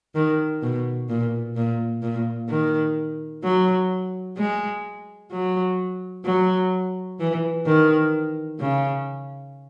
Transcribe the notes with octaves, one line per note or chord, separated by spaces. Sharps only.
D#3
B2
A#2
A#2
A#2
D#3
F#3
G#3
F#3
F#3
E3
D#3
C#3